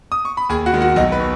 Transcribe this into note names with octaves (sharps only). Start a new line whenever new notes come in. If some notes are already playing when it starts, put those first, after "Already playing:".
D#6
C#6
B5
D#2 G#4 G#5
F#4 F#5
D#3 G#3
F#4 F#5
B1 D#4 D#5
B4
B2